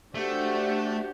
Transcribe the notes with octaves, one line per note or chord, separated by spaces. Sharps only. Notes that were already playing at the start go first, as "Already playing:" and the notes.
A3 D4 F#4 G4 C5 F#5